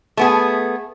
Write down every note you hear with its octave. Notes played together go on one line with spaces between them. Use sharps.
A3 B3 G#4